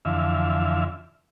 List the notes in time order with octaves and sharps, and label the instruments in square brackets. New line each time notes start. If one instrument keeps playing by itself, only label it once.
[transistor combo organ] F2 D3 E3 E5 F5